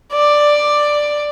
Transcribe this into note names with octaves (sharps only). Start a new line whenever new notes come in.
D5